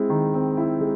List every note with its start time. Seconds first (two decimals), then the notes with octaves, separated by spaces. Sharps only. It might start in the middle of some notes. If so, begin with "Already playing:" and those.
Already playing: G#3 C4 E4
0.10 D#3
0.34 C4
0.57 E4
0.81 G#3